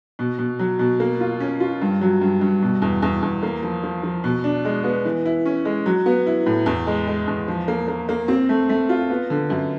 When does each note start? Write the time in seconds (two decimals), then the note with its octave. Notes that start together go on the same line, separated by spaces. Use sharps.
0.19 B2
0.39 B2
0.59 F#3
0.79 B2
1.00 A#3
1.20 F4
1.40 C#4
1.60 F4
1.82 G2
2.01 F#3
2.21 G2
2.41 G2
2.62 B2
2.82 E2
3.02 E2
3.22 E2
3.43 A#3
3.63 F3
3.83 F3
4.03 F3
4.24 B2
4.44 D4
4.65 G#3
4.84 B3
5.05 E3
5.26 E4
5.45 C#4
5.65 G#3
5.86 F#3
6.06 B3
6.27 E4
6.46 A2
6.66 E2
6.87 G#3
7.08 G#3
7.27 E2
7.48 F3
7.68 A#3
7.88 A#3
8.09 A#3
8.28 C4
8.49 A3
8.69 A3
8.89 F4
9.10 B3
9.30 D3
9.50 F#2